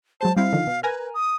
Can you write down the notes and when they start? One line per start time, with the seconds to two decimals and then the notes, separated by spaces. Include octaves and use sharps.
0.21 F#3 G#3 C5 A5
0.36 G3 C4 E4 F5
0.53 D3 D#3 F3
0.67 B2
0.83 A#4 B4 G#5 A#5
1.14 D#6